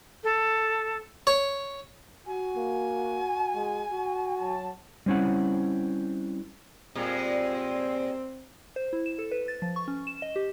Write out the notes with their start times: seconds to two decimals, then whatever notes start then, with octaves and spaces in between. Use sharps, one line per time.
0.23 A4
1.27 C#5
2.27 F#4 G#5
2.56 A#3
3.55 G#3
3.91 F#4
4.40 F#3 A5
5.06 G3 C4 C#4 E4 F#5
6.95 A#2 G3 G#3 C4
8.76 C5
8.93 E4
9.06 E7
9.19 A4
9.32 B4
9.48 A6
9.62 F3
9.76 C#6
9.88 C#4
10.07 E7
10.22 D#5
10.36 G4